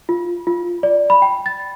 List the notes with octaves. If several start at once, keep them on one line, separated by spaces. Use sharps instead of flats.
F4
F4
D5
B5
G5
A6